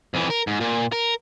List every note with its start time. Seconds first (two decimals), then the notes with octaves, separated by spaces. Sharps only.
0.14 F2 E3
0.30 A#4
0.47 G#2
0.60 A#2
0.92 A#4